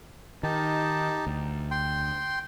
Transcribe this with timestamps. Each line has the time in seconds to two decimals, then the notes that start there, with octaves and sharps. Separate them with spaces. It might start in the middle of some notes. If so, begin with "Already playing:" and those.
0.43 D#3 D#4 G4 A5
1.27 D2
1.71 G5 C6